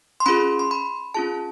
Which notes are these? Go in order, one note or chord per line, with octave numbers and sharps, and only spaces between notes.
C6
C#4 F4 G#4 B5
C6
B5
C#4 F4 G#4 A5